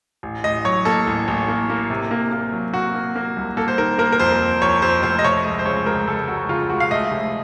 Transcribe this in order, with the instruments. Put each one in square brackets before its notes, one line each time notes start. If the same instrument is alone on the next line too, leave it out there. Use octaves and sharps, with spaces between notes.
[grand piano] A1
A1 D#5
F#3 C#5
A#3 A4
A1
A1
A#3
A#3
C3
A#3
A#3
F#3
A#3 F#4
A#3
A#3
C2
A#3 A4
C5
D#3 A#4
A#3 A#4
A#4
F2 C5
F2
F2 C#5
F2 C5
F1 C5
D#5
A3 C#5
C#2 D#5
C5
C#3 C#5
C#2 A#4
C#2 A4
C#2 F#4
C#3 F4
C#2 F#4
F5
A3 D#5
F1